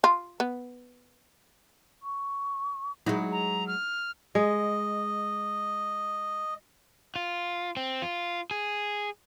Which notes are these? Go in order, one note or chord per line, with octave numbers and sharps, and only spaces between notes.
F4
B3
C#6
F#3 G#3 D#4 E4
A#5
F6
G#3 D#5
F4
C4
F4
G#4